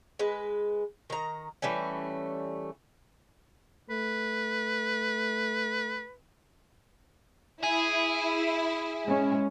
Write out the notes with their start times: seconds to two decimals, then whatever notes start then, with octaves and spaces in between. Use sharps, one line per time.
0.19 G#3 B4
1.10 D#3 A#5
1.62 E3 G3 A3 C#4
3.90 A3 B4
7.63 E4 G#4
9.07 G#3 C#4